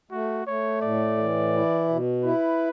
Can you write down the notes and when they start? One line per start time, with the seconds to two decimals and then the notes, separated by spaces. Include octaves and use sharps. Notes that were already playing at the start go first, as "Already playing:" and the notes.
0.11 A3 F#4
0.46 A3 C#5
0.82 A2 D5
1.17 E3
1.53 E4
1.89 B2
2.24 E4 B4